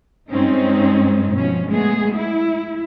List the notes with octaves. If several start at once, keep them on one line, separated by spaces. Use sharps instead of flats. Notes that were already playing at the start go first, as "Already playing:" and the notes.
G2 G#3 C4 C#4 D#4
B2 F3 C#4
G#3 A3 B3 G#4
E4